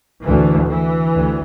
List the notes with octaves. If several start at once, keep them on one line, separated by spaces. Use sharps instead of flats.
D2 E3
E3
D2